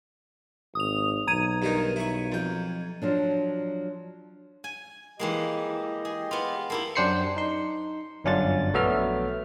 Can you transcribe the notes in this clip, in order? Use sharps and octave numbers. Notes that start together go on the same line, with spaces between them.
G#1 D#6 F7
B1 A#5 G#6 D#7
G2 D#3 D#4
E4 C#6
F2 G5
F3 F#3 D4
G#5
E3 G#3 A#3 G4 D#5
G#4
B3 F4
A#3 E4 G4 A5
F#2 D4 G4 C5 C7 C#7
D#4 C6
G1 F#2 C#4 D4 F4 A6
A#1 F#3 A3 B3 E5 F6